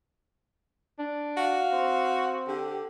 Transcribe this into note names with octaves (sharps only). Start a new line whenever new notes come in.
D4
F#4 F5
C4
D3 G4